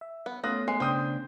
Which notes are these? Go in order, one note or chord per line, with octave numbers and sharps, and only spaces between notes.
E5
B3
A3 B3 C#4 F4 D#6 F#6 A#6
G#3 C7
C#3 D4 C5 G5 D#6 G6